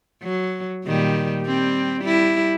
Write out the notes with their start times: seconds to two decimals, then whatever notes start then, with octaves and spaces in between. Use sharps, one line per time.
0.23 F#3
0.86 A#2 D#3 G3
1.43 G3 C4
2.02 G3 E4